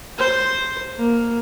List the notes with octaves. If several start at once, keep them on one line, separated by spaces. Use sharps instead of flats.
C5
A#3